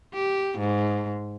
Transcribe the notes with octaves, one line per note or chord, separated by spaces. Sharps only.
G4
G#2